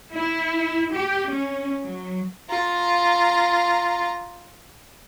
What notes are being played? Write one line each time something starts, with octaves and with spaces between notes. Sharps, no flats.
E4
G4
C#4
F#3
F4 A#5